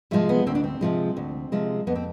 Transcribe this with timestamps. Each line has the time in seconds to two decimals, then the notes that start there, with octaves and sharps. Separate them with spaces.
0.11 C3 F3 G#3 A3
0.29 B3
0.47 D2 C4
0.55 D4
0.64 C4
0.81 C3 F3 G#3
1.17 D2
1.52 C3 F3 G#3
1.87 F2 B3
1.96 C4